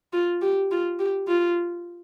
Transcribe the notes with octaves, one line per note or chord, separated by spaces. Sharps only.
F4
G4
F4
G4
F4